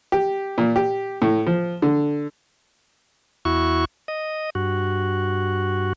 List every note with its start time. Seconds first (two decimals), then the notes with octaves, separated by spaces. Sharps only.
0.12 G4
0.58 A#2
0.76 G4
1.22 A2
1.46 F3
1.82 D3
3.45 E2 E4 F#4 C#6
4.08 D#5
4.55 G2 F#4